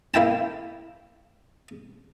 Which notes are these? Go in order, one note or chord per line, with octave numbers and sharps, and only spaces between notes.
A#3 E4 G5 A5